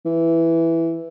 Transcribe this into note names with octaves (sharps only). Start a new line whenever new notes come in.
E3